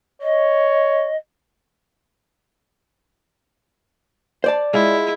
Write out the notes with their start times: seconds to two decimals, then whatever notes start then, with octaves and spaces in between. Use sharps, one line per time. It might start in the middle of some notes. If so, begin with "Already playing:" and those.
0.22 C#5 D#5
4.44 C5 D5 A5
4.73 G#3 E4 F4